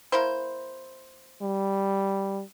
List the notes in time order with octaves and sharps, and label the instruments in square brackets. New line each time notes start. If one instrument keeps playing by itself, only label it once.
[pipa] A#3 E4 C5
[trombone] G3